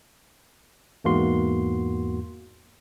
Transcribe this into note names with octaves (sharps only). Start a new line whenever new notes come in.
E2 G#2 A#3 F#4 C6